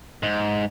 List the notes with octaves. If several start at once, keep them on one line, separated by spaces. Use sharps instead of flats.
G#2